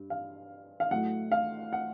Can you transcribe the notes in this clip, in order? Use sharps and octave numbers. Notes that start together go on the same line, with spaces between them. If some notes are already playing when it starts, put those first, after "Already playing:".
Already playing: G2
F5
F5
A2 F#3 A3 F#5
F5
F#5